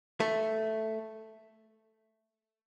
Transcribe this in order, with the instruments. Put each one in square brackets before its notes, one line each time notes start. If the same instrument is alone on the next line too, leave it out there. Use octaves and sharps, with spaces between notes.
[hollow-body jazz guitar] A3